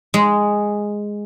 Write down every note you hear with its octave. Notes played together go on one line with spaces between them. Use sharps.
G#3